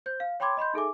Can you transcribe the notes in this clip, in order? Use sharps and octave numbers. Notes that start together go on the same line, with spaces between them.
C5 G6
F5
C#5 G5 B5 C6 D6 G#6
D#5 B5 C6 G6
D#4 G#4 A4 E5 G#5 D6